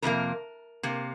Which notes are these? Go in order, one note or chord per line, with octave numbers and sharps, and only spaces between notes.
F2 C3 F3 A#3 A#4
C3 A#3